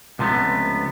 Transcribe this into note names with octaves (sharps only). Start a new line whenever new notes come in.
C#2 C3 F3 G#3 A3 B3